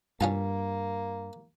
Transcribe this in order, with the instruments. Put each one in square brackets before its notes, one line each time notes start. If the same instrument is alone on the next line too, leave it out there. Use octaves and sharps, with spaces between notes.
[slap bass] G2 [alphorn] A#3 [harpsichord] C#4 F4 A5